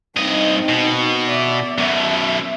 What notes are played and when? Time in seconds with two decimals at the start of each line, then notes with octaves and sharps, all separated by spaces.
0.17 G2 C4 D#4 D#5
0.69 B2
1.29 D5 E5
1.78 F#2 B2 E5